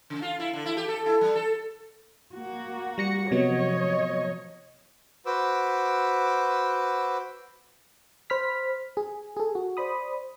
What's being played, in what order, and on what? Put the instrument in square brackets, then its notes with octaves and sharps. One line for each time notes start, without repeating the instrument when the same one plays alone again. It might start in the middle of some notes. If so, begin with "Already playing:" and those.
[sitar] C#3
F4
E4
D3
E4
G4
A4
E4
G3
A4
[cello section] A#3 F#4
[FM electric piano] G3 A#6 C#7
[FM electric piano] C3 F#3 B3 [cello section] F3 C#5 D#5
[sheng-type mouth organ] F#4 B4 C5 D6 E6
[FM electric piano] C5 B5 F6 B6
G#4
G#4 A4
F#4
C5 D5 B5 D#6